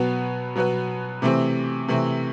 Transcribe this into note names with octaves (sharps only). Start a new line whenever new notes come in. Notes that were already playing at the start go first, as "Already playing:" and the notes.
Already playing: B2 F#3 B3 F#4 B4
B2 F#3 B3 F#4 B4
C3 E3 A3 C4
C3 E3 A3 C4